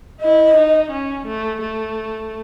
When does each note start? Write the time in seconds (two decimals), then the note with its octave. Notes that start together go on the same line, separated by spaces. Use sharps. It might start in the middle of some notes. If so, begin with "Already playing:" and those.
0.21 E4 D#5
0.56 D#4
0.91 C#4
1.27 A3
1.61 A3